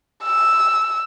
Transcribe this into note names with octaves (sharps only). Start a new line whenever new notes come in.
E6